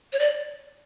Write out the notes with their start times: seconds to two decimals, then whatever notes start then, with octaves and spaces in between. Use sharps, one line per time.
0.13 C#5
0.19 D5